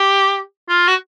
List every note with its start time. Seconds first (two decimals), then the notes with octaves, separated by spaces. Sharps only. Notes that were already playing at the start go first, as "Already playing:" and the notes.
Already playing: G4
0.69 F4
0.88 F#4